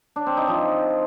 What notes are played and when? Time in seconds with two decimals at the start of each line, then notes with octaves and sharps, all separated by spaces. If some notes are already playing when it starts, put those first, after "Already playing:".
0.16 D4
0.26 C4
0.37 D#4
0.48 F3